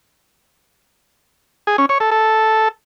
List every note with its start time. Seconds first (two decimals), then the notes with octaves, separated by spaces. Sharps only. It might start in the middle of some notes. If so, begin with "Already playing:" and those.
1.67 G#4
1.78 C#4
1.89 C#5
2.00 A4
2.11 A4